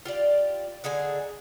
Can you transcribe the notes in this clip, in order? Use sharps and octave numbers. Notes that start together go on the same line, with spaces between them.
F4 G4 D5
D3 D#4 G#4 G#5